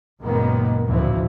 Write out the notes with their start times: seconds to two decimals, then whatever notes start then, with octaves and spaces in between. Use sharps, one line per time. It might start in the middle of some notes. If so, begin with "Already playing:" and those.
0.21 C#2 F#2 A#2 D#3 A#3 B3
0.86 A1 D2 B2 E3 F3